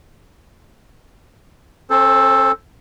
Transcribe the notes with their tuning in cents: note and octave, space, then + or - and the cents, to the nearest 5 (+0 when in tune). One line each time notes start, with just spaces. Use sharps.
C4 +45 A4 +0 C5 +0